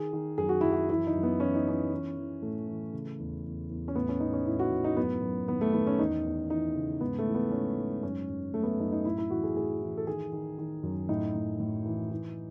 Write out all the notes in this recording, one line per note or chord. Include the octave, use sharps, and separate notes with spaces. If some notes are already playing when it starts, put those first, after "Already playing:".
Already playing: D#3 G#4
D#3
F#2 G#4
F#4
F#2 E4
F#4
E3 E4
D#4
F#2
B3
E3 C#4
D#4
E3 C#4
E3
E3
A2 A3
E3
C#3
E2
E2
E2
C#4
A2 B3
C#4
A2 D#4
C#4
A2 E4
F#4
A2
D#4
F#2 B3
F#2
D#3 B3
A3
D#3 B3
C#4
E2 D#4
E2
E3 D#4
C#3
G#2 B3
A3
E3
B3
G#2 C#4
G#2
F#2 C#4
F#2
F#2 A3
B3
A3
F#2 D#4
D#4
A2 E4
E4
E3 F#4
G#4
A2 G#4
E3
A4
D#3 G#4
D#3
D#3
F#2
A2 D#4
A2
A2
E3
E3